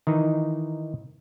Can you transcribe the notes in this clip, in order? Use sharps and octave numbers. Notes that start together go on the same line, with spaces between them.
D#3 E3 D#4